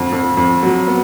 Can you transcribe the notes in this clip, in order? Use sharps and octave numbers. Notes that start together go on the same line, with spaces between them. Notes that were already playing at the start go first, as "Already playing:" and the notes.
Already playing: F2 D3
F2
F2
F#3
B3